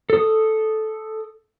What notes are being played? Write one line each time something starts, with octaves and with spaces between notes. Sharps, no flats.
A4 D#6